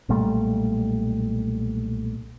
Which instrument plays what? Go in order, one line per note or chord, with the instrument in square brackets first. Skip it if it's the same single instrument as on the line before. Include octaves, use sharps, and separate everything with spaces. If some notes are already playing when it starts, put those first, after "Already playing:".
[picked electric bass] B1 A#2 G3 A3